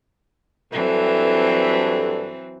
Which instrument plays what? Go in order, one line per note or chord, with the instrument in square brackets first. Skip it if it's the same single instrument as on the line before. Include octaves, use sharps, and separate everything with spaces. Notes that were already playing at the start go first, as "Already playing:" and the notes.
[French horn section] G2 A4 [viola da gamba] E3 F#3 C4